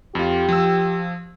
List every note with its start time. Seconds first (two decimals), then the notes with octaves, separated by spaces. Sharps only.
0.15 F2 F4 G4
0.49 F3 E6